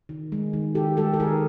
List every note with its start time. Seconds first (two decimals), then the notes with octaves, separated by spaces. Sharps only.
0.09 D#3
0.32 G#3
0.53 D#3
0.75 D#3 G4 A4
0.97 G#3 G4 A4
1.14 A4
1.20 D#3 G#4 A#4